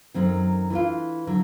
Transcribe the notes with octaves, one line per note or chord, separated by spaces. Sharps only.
F#2 D#3 F#3 A3 C4
E3 A3 D4 F4
D3 F#3